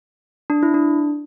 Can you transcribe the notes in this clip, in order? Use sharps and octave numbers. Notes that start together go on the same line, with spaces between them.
D4
E4
D4